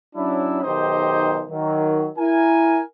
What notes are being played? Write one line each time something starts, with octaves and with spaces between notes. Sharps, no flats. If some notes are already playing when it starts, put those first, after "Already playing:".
F#3 C#4 D4 E4
B1 D#3 D#4 G4 C5 D#5
D#3 F#3
E4 A#4 G#5